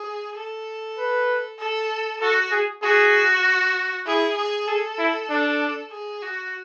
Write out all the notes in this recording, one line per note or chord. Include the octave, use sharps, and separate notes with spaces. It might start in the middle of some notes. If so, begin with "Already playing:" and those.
Already playing: G#4
A4
B4
A4
F#4 A4
G#4
F#4 G#4
E4 G#4
G#4
G#4 A4
E4
D4
G#4
F#4